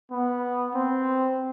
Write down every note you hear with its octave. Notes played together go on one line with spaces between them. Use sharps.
B3
C4